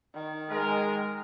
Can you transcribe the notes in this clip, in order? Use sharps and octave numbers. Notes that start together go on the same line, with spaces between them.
D#3
G#3 A#4